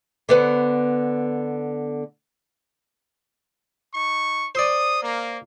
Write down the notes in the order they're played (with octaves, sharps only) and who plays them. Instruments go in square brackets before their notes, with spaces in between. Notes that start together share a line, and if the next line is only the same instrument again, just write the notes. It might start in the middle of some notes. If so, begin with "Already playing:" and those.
[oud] D3 B3 B4
[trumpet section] D#4 C#6
[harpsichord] C5 D5 [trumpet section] D#6
[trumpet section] A#3